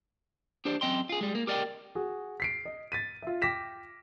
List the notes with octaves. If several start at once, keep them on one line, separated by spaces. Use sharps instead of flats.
D4 G4 C5 D5
F#2 B3 C4 D#5 G5 C6
F4 G#4
G3 G#3
A#3
G4 A#4 D5 D#5 G5
F#4 G#4
B6 C7 D7
D#5
A6 B6 D#7
F4 E5
G5 D6 A#6 B6 E7